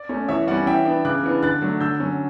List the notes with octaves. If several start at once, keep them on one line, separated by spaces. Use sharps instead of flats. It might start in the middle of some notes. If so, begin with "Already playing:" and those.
Already playing: D5
A3 C#4
E3 C#5 E5
G3 C#4 D5 F#5
E3 E5 G5
B3 D4
C#3 D6 F#6
E3 B3 D4
D3 F#6 A6
F#3 A3 D4
D3 E6 G6
F#3 C#4